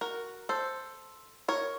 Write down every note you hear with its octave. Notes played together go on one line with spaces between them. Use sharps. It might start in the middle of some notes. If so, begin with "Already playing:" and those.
F#4 A#4
A4 C5
A#4 C#5